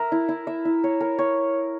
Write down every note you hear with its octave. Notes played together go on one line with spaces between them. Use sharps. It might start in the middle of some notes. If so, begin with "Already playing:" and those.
Already playing: A#4 E5
E4
E4
E5
E4
C#5
A#4
C#5